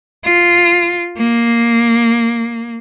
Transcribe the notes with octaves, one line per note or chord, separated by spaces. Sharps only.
F4
A#3